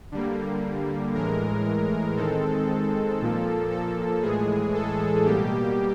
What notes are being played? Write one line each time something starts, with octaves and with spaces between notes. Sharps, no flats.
D3 G3 A#3
A2 E3 G#3 A#4
D#3 G#3 C4 A4
A#2 F3 A#3
A4
A2 E3 G#3 G#4
A4
B2 G3 A#3 G4